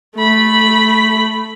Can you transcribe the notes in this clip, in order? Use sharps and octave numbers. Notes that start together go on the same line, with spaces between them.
A3 B5